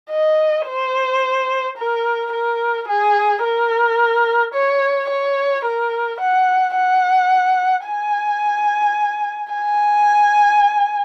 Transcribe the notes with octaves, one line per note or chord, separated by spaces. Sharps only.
D#5
C5
A#4
A#4
G#4
A#4
C#5
C#5
A#4
F#5
F#5
G#5
G#5